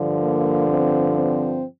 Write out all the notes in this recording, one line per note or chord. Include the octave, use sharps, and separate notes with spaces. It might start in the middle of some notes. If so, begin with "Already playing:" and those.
Already playing: G2 D3 F3
A#3
C4
C4